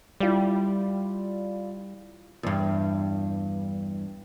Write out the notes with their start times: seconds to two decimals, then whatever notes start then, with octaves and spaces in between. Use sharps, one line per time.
0.20 G3 E4 F4 D5
2.43 E2 G2